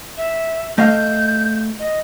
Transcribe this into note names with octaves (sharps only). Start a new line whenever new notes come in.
E5
A3 D#5 F5 G6
D#5